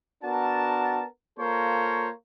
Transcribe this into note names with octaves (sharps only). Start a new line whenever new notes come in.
B3 D4 F#4 A#4 A5
A#3 F4 A4 A#4 C5 C#5